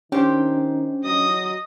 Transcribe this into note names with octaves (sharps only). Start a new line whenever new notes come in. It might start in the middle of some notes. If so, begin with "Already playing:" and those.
D#3 C#4 D4 G4 C5
F#3 D#5 D#6